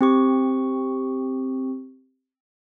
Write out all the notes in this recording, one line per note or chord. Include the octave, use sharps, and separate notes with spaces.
C4 G4 C#6